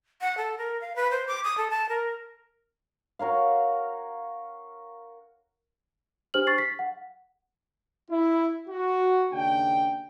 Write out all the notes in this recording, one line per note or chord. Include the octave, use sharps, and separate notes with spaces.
F#5
A4
A#4
F5
B4
C5
D6
D#6
A4
A5
A#4
F#4 A#4 C#5 F5
D4 G4 C5 F6 F#7
C#6 A6 C7
B6
F#5
E4
F#4
D#2 C#3 D4 G5